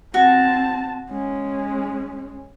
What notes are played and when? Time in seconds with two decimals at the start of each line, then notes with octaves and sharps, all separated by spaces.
0.14 C4 F#4 A5
1.10 G#3 C#4